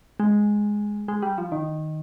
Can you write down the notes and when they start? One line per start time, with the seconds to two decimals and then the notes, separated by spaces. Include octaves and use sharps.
0.20 G#3
1.08 G#3
1.22 G3
1.38 F3
1.52 D#3